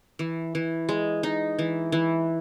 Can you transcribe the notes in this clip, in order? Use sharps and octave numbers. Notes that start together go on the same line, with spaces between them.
E3
E3
G#3
D#4
E3
E3